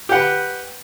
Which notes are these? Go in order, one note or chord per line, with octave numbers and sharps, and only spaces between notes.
G4 B4 F#5